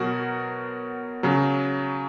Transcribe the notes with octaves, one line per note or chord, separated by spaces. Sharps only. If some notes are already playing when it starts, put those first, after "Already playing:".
Already playing: B2 F#3 F#4 A#4
C#3 F#3